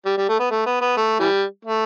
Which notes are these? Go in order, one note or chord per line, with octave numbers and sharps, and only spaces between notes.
G3
G3
A3
B3
A3
B3
B3
A3
E3 G3
A3